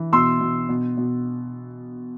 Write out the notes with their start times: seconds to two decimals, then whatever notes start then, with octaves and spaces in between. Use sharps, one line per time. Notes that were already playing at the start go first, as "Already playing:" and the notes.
Already playing: E3
0.13 B2 C6 E6
0.40 B2
0.69 B2
0.97 B2